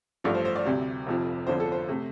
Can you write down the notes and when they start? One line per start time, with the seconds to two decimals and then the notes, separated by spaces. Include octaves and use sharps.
0.24 A1 G2 F3 A3 D5
0.34 C5
0.45 C5
0.56 D5
0.65 D2 C3 G3
1.07 F1 F2 C3 F3
1.47 G1 F2 D3 F3 C5
1.60 A4
1.72 C5
1.89 C3 A3